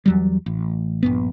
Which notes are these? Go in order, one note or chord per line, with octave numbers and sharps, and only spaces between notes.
E2 F#3 G3
A1
A#1 G2 B3